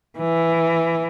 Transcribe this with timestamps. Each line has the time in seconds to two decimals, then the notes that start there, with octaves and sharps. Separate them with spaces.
0.18 E3